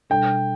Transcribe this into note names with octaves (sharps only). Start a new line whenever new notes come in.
B2 G3 D4 A4 G5